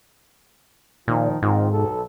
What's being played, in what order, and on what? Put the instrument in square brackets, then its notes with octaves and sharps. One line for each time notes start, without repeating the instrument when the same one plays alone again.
[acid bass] A#2 [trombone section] D#3 F3
[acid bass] G#2 [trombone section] D#3 C4 F4
[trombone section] B1 A4